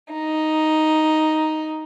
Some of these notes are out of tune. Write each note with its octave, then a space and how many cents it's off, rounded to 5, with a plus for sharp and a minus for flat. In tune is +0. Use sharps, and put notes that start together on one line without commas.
D#4 +5